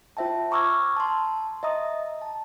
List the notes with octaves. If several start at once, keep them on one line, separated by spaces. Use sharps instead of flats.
F4 C5 E5 G5 A5
A#5 C#6 D6 E6 F6 G#6
A5 C6
D#5 E5 A#5 D#6
A5